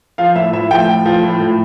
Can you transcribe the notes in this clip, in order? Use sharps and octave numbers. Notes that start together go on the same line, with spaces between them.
F3 F5
A2 E5
A2 E5
F3 G5
A2
F3
A2
A2